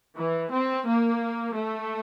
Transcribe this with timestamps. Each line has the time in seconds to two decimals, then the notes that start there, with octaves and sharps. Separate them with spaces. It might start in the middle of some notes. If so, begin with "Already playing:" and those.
0.16 E3
0.51 C4
0.86 A#3
1.54 A3